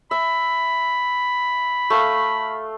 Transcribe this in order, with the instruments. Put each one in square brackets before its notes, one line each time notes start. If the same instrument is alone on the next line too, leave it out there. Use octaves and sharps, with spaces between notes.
[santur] E5 [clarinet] B5
[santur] A3 F5